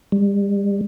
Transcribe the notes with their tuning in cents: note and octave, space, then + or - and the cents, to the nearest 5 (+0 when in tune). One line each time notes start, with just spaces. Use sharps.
G3 +35